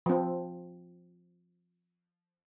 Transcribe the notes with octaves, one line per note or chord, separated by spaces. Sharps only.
F3 C4